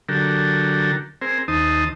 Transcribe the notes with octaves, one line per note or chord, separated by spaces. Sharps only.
D3 F#3 G4 A4 A#4
C4 G#4 A#4 C5
D#2 D#4 C5 A5 D#6